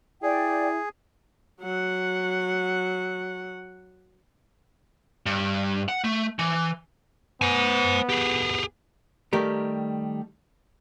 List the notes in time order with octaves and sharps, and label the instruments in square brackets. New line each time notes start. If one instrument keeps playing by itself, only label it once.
[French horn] E4 [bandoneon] G#4 [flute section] D5 G5
[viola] F#3 F#5
[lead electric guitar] G2
F#5
A3
E3
[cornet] B3 [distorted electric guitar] C5 G#5
[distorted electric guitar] G4 G#4
[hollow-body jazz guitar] D#3 G3 A3 G4 A#4